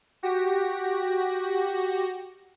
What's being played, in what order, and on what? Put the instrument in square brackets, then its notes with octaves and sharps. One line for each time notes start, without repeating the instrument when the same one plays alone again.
[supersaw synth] F#4 G4 A#6